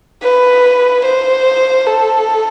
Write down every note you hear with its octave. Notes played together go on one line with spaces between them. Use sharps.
B4
C5
A4